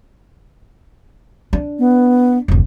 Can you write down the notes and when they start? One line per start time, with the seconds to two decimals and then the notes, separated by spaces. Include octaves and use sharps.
1.53 D4
1.79 B3
2.48 F1 D2